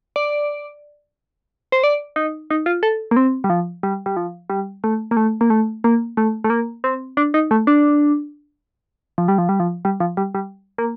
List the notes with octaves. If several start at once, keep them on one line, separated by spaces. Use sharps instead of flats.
D5
C5
D5
D#4
D#4
F4
A4
A#3
C4
G3
F3
G3
G3
F3
G3
A3
A#3
A3
A#3
A3
A#3
A3
A3
A#3
C4
D4
D#4
A3
D4
F3
G3
F3
G3
F3
G3
F3
G3
G3
A#3